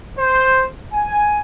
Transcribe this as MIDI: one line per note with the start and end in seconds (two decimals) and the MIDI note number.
0.17 0.63 72
0.93 1.40 80